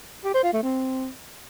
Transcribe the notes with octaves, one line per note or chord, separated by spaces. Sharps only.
G4
C5
F4
A3
C4